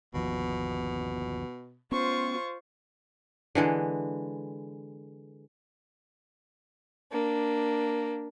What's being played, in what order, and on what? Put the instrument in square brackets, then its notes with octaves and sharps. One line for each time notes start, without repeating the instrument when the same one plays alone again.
[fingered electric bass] G1 D#2 F3 [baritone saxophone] B2
[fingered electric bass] B3 C#4 [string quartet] F4 C5 C#6
[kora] D3 E3 G#3
[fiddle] A#3 D4